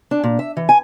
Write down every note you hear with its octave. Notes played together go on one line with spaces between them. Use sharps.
D4
A#2
E5
E3
G#5